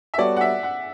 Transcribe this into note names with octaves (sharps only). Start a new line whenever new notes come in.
E5
G3 B3 F#4 A4 C#5 D5
F#5
E5
F#5